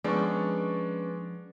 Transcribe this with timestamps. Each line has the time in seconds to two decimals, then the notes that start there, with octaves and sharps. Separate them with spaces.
0.04 F3 G#3 B3 C#4 D4 D5 C#6